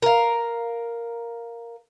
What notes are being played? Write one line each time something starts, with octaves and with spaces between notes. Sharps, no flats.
A#4 F5